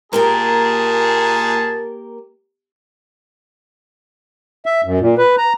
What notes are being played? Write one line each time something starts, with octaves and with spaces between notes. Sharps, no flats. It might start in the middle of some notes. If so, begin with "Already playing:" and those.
A#2 A#3 G4 G#4 A#4 A5
E5
F#2
A#2
B4
A#5